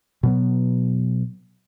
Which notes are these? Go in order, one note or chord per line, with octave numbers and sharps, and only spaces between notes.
B2 F#3 B3